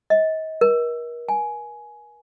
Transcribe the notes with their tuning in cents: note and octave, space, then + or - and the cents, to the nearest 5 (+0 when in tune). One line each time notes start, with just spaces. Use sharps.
D#5 +35
A#4 +40
G#5 +15